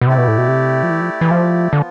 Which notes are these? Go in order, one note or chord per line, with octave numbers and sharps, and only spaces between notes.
B2
C3 A3 E4 G4 D5
B2
A2
B2
C3
F3
E3
F3
E3
F3
D3 F3 B3 F4